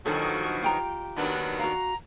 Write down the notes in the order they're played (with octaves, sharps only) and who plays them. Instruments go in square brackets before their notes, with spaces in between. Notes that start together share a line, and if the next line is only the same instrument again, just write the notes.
[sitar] G2 B2 D#3 [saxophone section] F3 F#3 [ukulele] A4 [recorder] G#5
[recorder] C#6
[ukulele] F4 G5 A#5 [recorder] G4
[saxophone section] D#2 F#3 B3 [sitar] D#3 D4
[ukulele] F#4 F5 [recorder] A#5